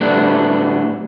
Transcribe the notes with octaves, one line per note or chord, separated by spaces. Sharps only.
A2 D3 G3 A3 B3 D4